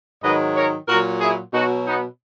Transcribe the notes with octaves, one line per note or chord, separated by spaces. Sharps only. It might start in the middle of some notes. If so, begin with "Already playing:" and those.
G#2 D#3 F#3 B4 D#5
A#4 C#5
A#2 F#3 F#4 A#4
E4 G#4
B2 F#3 D#4 F#4
B3 D#4